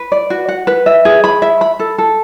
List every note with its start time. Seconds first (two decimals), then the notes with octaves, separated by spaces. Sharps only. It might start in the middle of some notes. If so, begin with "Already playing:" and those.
Already playing: B4
0.12 D5
0.30 F#4
0.48 F#5
0.67 B4
0.86 E5
1.05 G#4
1.24 B5
1.42 E5
1.61 B5
1.80 A4
1.98 A4